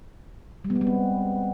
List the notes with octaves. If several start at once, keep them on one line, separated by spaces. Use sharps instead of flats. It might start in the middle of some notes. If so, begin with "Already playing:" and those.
G3
B3
G#3
B3
C4